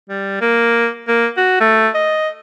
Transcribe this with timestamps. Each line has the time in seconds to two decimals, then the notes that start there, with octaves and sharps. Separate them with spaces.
0.09 G3
0.41 A#3
1.08 A#3
1.37 F#4
1.60 A3
1.95 D#5